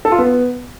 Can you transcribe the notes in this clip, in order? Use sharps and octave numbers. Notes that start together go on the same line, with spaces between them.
A4
F4
B3